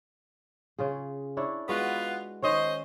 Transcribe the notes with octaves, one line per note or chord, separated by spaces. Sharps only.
C#3 F4 G#4
D4 E4 C#5
G#3 B3 F4 F#4 B4
D#3 C#4 C5 C#5 D#5